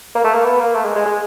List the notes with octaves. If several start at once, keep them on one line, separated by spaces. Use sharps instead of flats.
A#3
A3
A#3
B3
A#3
A3
G#3
G#3
G#3